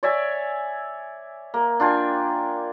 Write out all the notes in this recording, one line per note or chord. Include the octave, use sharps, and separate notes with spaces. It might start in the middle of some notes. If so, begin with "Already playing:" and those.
C#5 D5 E5 G#5
A#3
D4 F4 G5 G#5